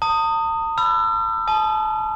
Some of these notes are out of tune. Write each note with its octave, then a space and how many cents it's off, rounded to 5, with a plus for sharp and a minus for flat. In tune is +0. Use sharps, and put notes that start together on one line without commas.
A5 +45 D#6 +0
B5 +0 E6 +40
A5 -30 D#6 +0